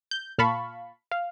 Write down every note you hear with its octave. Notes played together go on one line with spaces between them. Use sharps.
G6
A#2 F5 A5 B5 C#6
F5